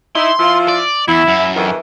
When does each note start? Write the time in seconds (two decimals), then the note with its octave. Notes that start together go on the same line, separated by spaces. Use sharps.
0.16 D#4 E4 C6
0.39 F3 E4 F4
0.68 D5
1.08 E2 E4
1.28 F#2
1.56 F2 D#3 E3